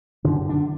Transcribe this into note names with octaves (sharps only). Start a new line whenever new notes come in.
F#2 D3 D4
D3 D4